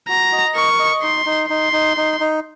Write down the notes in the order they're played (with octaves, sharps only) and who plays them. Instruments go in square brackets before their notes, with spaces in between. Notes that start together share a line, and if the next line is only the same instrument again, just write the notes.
[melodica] F#4 [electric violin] A#5
[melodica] D#5
[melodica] A#4 [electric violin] C#6
[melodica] D#5
[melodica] D#4 [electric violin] C6
[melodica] D#4
[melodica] D#4 [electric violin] C6
[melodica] D#4
D#4
D#4